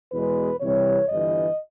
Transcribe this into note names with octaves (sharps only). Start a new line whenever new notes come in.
E2 B2 G#3 B4
C2 C3 E3 G3 C#5
G1 G2 E3 D#5